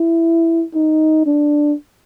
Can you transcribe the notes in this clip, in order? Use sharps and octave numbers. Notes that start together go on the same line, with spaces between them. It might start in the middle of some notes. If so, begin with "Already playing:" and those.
Already playing: E4
D#4
D4